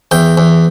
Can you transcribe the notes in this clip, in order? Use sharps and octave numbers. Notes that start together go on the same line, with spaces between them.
E2 G5
E2